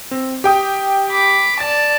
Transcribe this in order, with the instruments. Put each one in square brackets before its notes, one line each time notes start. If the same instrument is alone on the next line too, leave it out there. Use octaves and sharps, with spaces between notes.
[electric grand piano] C4
G4 G5 D#6
[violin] B5 D6
[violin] D5 A5 [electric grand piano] A6